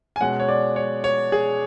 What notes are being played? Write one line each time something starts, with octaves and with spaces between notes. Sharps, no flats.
G#5
B2 G#3 C#4 F#5
C#5
D5
C#5
C#5
G#4